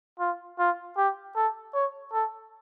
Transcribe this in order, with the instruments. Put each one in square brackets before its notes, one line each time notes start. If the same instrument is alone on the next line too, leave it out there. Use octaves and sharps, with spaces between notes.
[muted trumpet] F4
F4
G4
A4
C#5
A4